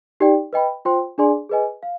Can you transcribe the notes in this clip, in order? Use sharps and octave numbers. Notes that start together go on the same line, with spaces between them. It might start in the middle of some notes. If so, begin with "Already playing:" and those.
D#4 G4 D5 G5
B4 D#5 G5 B5
F4 C5 G5 C6
D4 G#4 D5 G#5 C6
G#4 B4 D#5 G#5
F5